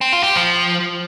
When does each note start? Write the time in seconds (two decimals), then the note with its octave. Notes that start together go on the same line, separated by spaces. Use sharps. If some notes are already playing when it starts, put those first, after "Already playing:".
0.01 C4
0.12 F4
0.24 G4
0.35 F3